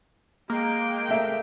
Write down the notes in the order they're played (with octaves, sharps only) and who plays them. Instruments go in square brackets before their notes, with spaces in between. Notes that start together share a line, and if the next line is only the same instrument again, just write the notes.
[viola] G#3 G5 [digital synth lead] A#3
[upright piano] A3 E5 F5